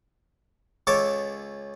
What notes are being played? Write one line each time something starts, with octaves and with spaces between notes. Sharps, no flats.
C#2 A4 C#5 D6